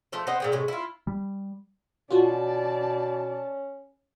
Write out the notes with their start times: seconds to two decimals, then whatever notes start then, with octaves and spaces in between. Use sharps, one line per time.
0.12 F3 A3 A4
0.27 B3 C4 C5 D#5
0.40 A#2 G#4 G5
0.52 A2 C3 G#3 C#4
0.68 E4 F4
1.07 G3
2.10 B2 C#4 F4 F#4 D5 A5